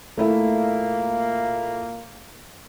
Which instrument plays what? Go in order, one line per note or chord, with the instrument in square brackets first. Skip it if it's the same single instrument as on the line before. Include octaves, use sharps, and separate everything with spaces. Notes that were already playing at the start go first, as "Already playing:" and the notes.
[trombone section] A#2 A#3 [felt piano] A3 E4 E5